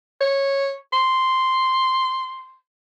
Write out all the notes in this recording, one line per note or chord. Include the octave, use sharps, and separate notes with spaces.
C#5
C6